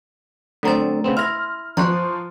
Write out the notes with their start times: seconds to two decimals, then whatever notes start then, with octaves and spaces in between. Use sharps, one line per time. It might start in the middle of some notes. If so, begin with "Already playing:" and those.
0.63 D3 F#3 A3 C4 A#5 A6
1.04 C#3 B3 C4
1.17 E4 C6 F6 A#6
1.77 F3 C5 A#5 C#6 F#6